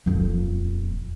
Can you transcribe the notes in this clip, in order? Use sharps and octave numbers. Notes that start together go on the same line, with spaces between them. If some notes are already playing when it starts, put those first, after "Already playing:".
D#1 F2